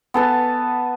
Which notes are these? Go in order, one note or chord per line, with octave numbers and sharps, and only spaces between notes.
B3 A4 A5